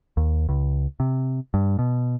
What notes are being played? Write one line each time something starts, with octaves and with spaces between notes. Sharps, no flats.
D#2
C#2
C3
G2
B2